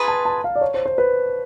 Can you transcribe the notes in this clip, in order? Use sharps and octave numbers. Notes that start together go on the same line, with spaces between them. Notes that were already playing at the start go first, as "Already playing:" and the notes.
Already playing: F4 G#4 B4 A#5
A5
A5
F5
D5
C#5
C5
C5
B4